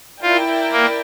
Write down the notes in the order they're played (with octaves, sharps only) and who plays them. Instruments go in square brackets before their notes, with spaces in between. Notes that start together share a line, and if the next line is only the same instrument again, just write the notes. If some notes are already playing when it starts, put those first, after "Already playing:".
[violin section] E4 A#4 D5 G5 [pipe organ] F4
[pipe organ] A#3